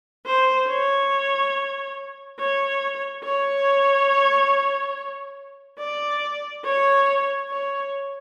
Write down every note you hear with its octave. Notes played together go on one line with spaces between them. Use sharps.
C5
C#5
C#5
C#5
D5
C#5
C#5